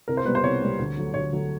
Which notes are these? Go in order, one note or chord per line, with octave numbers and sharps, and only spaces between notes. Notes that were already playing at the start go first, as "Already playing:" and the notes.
C2 A#4
C5
B2 G3 A#3 B4
C5
C2 C#5
B2 G3 A#3
D2
D3 F#3 A3
D2 C#5
D3 F#3 A3